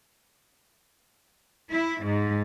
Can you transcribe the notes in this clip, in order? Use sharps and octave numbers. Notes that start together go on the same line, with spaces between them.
E4
G#2